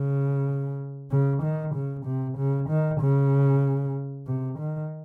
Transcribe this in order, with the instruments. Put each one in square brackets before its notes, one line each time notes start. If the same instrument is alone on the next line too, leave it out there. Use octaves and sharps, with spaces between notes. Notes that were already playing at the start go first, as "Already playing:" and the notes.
Already playing: [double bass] C#3
C#3
D#3
C#3
C3
C#3
D#3
C#3
C3
D#3